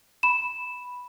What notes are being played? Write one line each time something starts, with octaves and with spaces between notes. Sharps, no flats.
B5 E7